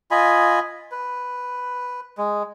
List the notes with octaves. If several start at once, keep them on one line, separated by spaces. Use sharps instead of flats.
F4 D#5 G#5 B5
B4
G#3